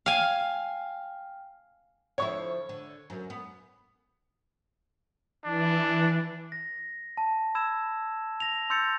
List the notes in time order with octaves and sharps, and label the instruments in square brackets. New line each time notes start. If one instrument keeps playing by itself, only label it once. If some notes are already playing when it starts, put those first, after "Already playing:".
[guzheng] F5 G#5 [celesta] G5 F6
[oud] D3 F3 E4 [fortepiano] C#5 C#6
[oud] D3
F#2
B3
[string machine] E3 [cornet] D4
[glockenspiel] A#6
A5
B5 E6 G#6 E7
A#6 F7
C6 E6 G6 A6 C#7 F7